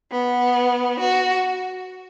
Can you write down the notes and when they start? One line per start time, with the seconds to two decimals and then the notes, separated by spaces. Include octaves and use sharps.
0.12 B3
1.01 F#4